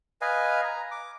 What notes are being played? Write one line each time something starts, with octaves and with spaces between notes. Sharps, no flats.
B4 D#5 F5 G#5
A#5
D6